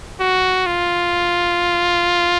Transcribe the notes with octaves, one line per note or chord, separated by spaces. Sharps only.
F#4
F4